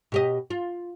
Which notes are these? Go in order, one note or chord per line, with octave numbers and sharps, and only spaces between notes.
B2 G4 D#5
F4